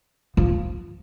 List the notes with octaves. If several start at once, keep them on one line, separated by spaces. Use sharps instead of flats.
F3